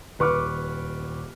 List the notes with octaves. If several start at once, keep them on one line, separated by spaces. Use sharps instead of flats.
D#1 B4 C#6 D6 F6